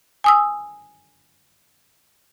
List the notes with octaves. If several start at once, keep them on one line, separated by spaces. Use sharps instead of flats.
G#5 D#6 E6